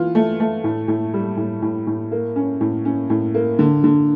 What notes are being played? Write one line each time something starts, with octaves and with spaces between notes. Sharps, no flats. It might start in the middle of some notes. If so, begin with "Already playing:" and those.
Already playing: E3 F4
A3
A3
A2
A2
G3
A2
A2
A2
A#3
C#4
A2
C#4
A2
A#3
D3
D3